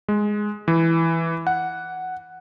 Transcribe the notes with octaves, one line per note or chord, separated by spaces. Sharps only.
G#3
E3
F#5